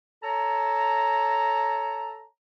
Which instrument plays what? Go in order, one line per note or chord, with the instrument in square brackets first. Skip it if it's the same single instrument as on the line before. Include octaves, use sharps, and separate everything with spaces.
[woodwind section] A4 C#5 A5 A#5